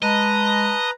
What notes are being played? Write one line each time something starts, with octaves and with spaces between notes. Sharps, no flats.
G#3 B4 D#5 A5 A#5